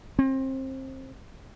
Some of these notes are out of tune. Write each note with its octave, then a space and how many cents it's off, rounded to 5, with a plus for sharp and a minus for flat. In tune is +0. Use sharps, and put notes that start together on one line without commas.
C4 +25